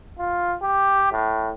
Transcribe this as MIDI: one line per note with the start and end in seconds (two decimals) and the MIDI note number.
0.19 0.55 65
0.62 1.11 67
1.12 1.51 45